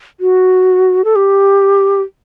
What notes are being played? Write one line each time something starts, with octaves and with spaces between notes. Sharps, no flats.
F#4
A4
G4